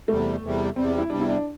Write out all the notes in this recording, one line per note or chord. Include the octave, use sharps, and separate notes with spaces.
E2 C3 G3 A3
E2 C3 G3
E2 C3 G3 C4
E4
E2 C3 G3 D4
E4
D4